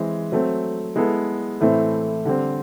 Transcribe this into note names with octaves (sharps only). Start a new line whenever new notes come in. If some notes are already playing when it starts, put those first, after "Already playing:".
Already playing: E3 G#3 C4
F#3 A3 C4
G#3 B3 E4 A4
A2 E3 A3 C4
D3 G3 C4